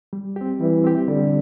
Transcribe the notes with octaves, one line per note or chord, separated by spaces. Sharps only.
G3
C4 G4
E3 G3
C4 G4
D3 G3